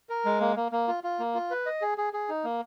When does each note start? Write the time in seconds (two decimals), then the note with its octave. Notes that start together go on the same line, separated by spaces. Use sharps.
0.09 A#4
0.25 G#3
0.41 A#3
0.56 A#3
0.72 A#3
0.88 F4
1.04 F4
1.19 A#3
1.34 F4
1.51 B4
1.66 D#5
1.82 G#4
1.98 G#4
2.13 G#4
2.29 D#4
2.44 A#3